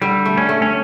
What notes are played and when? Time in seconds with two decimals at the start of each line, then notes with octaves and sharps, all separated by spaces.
0.02 D3 G3
0.25 A3
0.37 C#4
0.49 A3
0.62 C#4